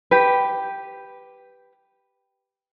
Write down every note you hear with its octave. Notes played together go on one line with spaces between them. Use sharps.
G4 B4